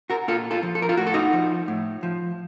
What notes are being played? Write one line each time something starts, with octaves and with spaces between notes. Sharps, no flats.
F#4 A#4
A#2 F4 A4
F4 A4
F3
A4
A#4
F4 A4
A2 F#4
A4
D#4 F#4
F3
A2
F3